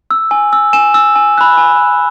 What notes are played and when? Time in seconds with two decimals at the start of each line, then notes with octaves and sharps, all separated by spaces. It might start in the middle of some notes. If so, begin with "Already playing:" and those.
0.11 E6
0.31 G#5
0.53 E6
0.73 G#5 E7
0.94 E6
1.16 G#5
1.38 B5 F#6
1.58 G#5